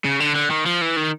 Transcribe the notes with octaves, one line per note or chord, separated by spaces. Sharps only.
C#3
D3
D3
D#3
F3
E3
D#3